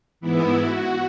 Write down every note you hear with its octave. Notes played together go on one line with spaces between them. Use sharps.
G#2 E3 B3 E4
F#4